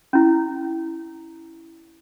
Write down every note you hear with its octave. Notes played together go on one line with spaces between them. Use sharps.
C#4 E4